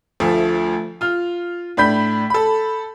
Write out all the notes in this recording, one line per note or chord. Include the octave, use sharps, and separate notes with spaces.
D2 F3 A3
F4 F6
A2 D4 B5 G6 B6
A4 B5